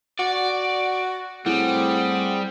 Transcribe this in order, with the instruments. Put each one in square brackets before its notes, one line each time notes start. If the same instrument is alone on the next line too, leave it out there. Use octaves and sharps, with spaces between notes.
[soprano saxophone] F#4 [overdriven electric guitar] D5
[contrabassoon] A2 [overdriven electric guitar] G3 [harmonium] C4 G#4 [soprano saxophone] F#5